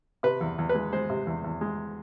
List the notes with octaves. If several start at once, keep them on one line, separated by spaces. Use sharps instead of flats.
C3 B4
E2
E2
B4
G#3
G#3 C5
C3
E2
E2
G#3